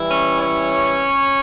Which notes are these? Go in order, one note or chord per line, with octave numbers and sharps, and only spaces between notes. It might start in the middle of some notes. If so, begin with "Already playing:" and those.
Already playing: E3 G3 E4
C#4 C#5
C#4 C#5